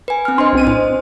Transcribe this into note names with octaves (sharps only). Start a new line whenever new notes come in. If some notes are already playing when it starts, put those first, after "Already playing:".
B4 G#5
C4 F6
D4 C5 D#5 C6
B1 C4 D#7
A2 C5